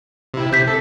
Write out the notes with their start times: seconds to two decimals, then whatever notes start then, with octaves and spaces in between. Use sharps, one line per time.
0.34 C3 E4
0.53 C3 G6 B6
0.67 A4